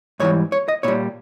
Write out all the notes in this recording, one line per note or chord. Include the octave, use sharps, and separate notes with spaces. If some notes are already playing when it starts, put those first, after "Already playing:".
G#2 E3 G3 C#5
C#5
D#5
A#2 G3 C#5